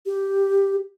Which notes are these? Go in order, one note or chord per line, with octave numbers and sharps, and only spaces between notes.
G4